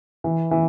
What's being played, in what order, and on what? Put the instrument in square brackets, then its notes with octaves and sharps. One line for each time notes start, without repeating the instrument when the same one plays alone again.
[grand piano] E3
E3